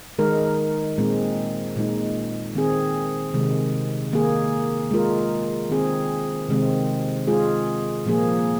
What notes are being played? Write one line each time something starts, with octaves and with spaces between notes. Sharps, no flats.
D#3 G#3 D#4 A#4
A#2 G#3 C4
A#2 G#3 D#4
D#3 C4 G#4
C3 D#3 G#3
D#3 A#3 G#4
G#3 F4 A#4
D#3 C4 G#4
C3 D#3 G#3 C4
G#3 F4 G#4
A#2 F3 A#3 G#4